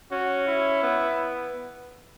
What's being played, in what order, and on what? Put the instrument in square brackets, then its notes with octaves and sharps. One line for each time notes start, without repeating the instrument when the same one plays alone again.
[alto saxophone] C#4 [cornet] F#4
[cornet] E4
[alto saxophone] B3